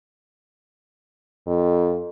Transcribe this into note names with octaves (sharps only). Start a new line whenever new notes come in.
F2